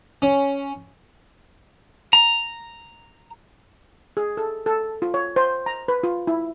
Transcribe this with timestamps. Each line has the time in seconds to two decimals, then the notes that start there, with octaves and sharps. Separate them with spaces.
0.22 C#4
2.13 A#5
4.17 G#4
4.37 A4
4.66 A4
5.02 F4
5.14 C#5
5.36 C5
5.66 A#5
5.88 B4
6.03 F4
6.27 E4